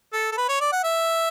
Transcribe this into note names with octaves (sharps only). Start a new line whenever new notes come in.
A4
A4
B4
C#5
D5
F#5
E5